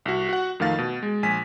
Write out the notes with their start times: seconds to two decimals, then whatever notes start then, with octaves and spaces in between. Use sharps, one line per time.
0.05 C2 F#4
0.29 F#4 F#5
0.60 F2 D#3 A3 F5 A6
0.79 B2
1.03 G#3
1.23 A#1 G#5 B6